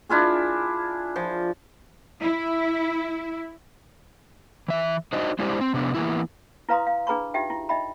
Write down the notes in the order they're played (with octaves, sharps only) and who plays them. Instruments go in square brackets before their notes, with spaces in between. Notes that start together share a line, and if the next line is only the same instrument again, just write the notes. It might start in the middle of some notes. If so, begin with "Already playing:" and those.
[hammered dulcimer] D4 E4 F4 G#4
F3
[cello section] E4
[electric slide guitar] E3 E5
D4 D#4 F#4 C5 D#5
G#3 D4 E4 G4 C5 D5
C4
C3 B3 D4
E3 A#3 B3 E4
[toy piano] E4 B4 F5 A#5 C6 D#6
F5
D4 G#4 B4 A#5 B5 C#6
D#4 F4 G4 E5 G5
E4
D#4 D#5 E5 G5 B5